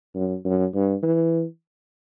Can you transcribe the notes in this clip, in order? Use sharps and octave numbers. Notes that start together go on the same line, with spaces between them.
F#2
F#2
G2
E3